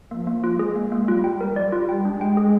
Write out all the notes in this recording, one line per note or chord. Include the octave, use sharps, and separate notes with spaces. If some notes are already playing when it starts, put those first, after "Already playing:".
F3 A#3
A#3
F4
G#3 G#4
A#3
A#3
G3 F4
G5
A#4
G3 D5
F4
G5
G#3 D4
G5
G#4